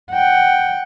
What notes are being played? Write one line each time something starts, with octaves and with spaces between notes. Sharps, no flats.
F#5 G5